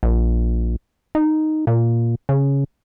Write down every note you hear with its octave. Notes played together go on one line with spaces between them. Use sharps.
A#1
D#4
A#2
C#3